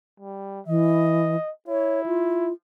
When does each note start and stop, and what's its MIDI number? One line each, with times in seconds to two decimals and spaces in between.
0.20 0.61 55
0.67 1.36 52
0.67 1.50 75
1.68 2.51 64
1.68 2.05 73
2.06 2.52 65